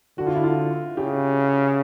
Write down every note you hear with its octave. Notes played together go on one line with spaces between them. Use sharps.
D3 F#4
F4
E4
F4
C#3 G4